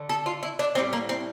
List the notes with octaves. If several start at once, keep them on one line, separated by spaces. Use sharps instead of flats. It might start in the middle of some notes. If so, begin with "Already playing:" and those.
Already playing: D3 A3
A4
F4
E4
D4
A2 E3 G3 C4
A#3
C4